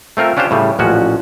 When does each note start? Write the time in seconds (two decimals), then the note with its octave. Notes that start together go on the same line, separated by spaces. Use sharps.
0.17 A3 C4 F4 A#4
0.37 C#4 D4 F4 G4 C5
0.51 A2 C#3 G3
0.79 A1 A#2 F3 C#4 F#4